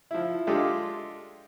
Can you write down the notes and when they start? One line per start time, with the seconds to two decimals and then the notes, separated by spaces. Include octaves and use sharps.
0.11 F3 E4
0.47 G#3 D4 F4 G4 A4